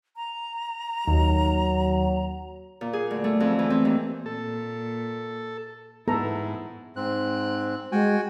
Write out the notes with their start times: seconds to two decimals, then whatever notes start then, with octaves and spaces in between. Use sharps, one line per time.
0.16 A#5
1.07 D#2 F#3
2.81 A#2
2.93 G#4
3.11 D2
3.24 A3
3.40 F2
3.59 E3
3.70 C4
3.85 D#2
4.26 A#2 A4
6.08 G#2 B3 E4 A4 A#5
6.96 G#2 C4 F#6
7.92 G#3 F#4 G5 G#5